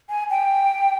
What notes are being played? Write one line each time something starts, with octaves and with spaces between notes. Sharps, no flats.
G#5
G5